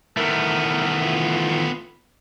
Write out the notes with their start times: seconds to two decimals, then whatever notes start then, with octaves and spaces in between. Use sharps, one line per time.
0.17 D#3 E3 A3 B3 A#4
1.05 F4